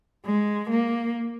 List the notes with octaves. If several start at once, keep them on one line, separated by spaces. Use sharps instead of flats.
G#3
A#3